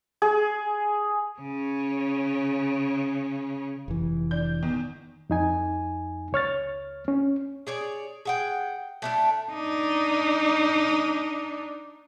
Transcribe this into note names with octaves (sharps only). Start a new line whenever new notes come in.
G#4
C#3 C#4
F1 E3
D4 G6
E2 D#3
F2 D#4 G#5
C#2 C#5 F6 A6
C#4
G#4 C#5 D5
G#4 F#5 G5
A3 D4 E4
D4 D#4